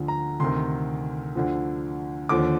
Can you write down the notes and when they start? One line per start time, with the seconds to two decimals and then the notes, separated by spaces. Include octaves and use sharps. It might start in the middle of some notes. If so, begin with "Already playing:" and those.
Already playing: D2 D3 F3
0.08 A#5
0.40 D2 C3 D#3 C6
1.35 D2 D3 F3
2.29 D#2 D3 F3 D6